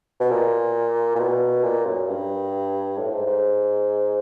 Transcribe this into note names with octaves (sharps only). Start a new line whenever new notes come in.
B2
A#2
A#2
B2
A#2
F#2
G2
A2
G#2
G#2